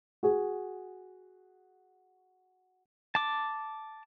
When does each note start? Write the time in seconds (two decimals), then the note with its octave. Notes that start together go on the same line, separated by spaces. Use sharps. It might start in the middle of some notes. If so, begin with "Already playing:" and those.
0.23 F#4 G#4
3.15 A5 D6